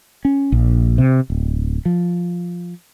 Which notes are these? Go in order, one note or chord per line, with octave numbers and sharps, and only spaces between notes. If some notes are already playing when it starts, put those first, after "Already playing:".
C#4
A#1
C3
D1
F3